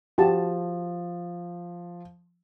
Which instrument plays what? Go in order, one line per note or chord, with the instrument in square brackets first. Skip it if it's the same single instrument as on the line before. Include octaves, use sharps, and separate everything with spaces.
[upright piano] F3 [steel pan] F#4 G4 A5